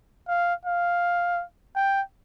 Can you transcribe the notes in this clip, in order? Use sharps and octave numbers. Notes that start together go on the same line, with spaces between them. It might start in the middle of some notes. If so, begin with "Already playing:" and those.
F5
F5
G5